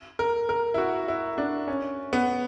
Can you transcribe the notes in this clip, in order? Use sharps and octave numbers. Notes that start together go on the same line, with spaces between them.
A#4
A#4
E4
F#4
E4
D4
C#4
B3